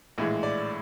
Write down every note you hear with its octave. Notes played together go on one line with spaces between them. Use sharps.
A#1 A2 E3 G#3
D5